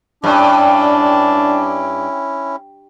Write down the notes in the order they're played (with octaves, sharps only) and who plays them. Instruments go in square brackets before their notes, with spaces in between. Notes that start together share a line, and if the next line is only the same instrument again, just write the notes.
[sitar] G2 [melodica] C#4 E4 [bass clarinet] D4